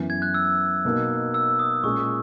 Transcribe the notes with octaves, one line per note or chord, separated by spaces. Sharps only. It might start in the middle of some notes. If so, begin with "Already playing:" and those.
Already playing: F#2 E3 B3
G#6
F#6
E6
B2 A#3 D#4
E6
D#6
A#2 G#3 C#4 C#6